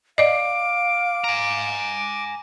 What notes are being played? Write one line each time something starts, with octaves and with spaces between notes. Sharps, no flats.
D5 D#5 F5 D6
G#5 A#5